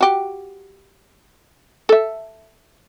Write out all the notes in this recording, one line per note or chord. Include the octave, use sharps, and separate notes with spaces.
F#4 G4
A4 E5